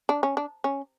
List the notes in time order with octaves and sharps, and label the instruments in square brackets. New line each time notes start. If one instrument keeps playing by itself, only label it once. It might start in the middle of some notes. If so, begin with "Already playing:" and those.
[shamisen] D4
C#4
D4
C#4